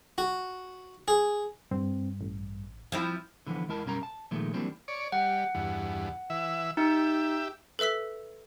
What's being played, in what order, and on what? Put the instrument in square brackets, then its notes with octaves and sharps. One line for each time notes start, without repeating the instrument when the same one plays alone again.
[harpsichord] F#4
G#4
[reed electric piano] G2 [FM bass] C4
[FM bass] A1
[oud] F3 C4 E4
[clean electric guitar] D3 E3 F3 B3
E2 G#3 E4 A#4 A5
B1 F#2 G3 C#4 A#4 A#5
A5
A#2 D#3 F3 G#3 A3
E3 F#3 G3 A#3 C4 D4
[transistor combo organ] C#5 D5
[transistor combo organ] G3 [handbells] F#5
[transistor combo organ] E2 G2
E3 E5
[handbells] D#4 [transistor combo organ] G4 E5
[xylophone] A4 B4 E5 E6 B6